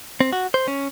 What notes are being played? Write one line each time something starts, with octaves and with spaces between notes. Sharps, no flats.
C4
F#4
C5
C#4